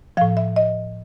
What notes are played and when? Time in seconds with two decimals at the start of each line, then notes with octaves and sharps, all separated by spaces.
0.17 A2 F3 F5
0.37 E5
0.56 D#5